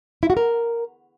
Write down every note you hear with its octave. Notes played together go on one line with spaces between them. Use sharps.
E4
F#4
A#4